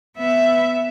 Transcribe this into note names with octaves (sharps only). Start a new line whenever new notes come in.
B3 E5